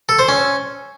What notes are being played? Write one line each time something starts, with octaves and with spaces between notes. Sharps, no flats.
A4
C5
C#4